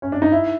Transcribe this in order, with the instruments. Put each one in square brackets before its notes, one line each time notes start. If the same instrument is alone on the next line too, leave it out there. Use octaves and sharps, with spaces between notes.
[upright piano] C#4
D4
D#4
E4